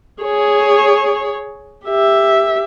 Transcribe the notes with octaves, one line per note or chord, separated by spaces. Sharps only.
G#4 C#5
G4 E5